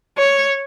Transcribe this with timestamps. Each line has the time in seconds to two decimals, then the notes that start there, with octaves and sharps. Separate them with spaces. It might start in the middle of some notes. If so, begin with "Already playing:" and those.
0.18 C#5